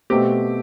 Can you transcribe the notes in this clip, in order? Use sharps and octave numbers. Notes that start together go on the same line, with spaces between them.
B2 A3 C4 G4